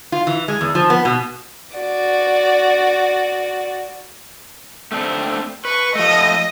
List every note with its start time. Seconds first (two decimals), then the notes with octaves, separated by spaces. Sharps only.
0.12 F4
0.27 E3
0.48 G#3
0.61 E2
0.75 F3
0.90 B3
1.05 B2
1.76 F#4 D5
4.92 A3 C4 D4
5.65 B4 C#6
5.95 F3 A3 D#5